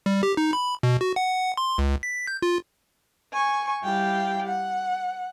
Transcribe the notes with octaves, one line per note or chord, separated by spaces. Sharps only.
G3
G4
D#4
B5
B2
F#4
F#5
C6
C#2
B6
G6
F4
G#5 C#6
G3 E4 G4 F5 G5
F#5